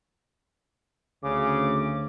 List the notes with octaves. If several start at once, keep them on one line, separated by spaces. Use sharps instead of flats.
D2 C#3 D6